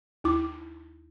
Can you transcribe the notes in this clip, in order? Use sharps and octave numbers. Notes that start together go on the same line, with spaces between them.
D#2 E4 D6